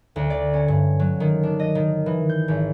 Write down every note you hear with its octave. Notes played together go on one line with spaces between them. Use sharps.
D2
D5
C#4
G2
F#3
D#3
D4
D#5
D#3
E3
G6
G#1